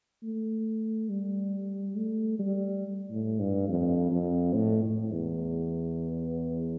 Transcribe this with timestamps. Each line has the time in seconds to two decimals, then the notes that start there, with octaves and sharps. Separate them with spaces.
0.23 A3
1.09 G3
1.96 A3
2.39 G3
3.11 A2
3.39 G2
3.68 F2
4.11 F2
4.54 A2
4.84 A2
5.12 E2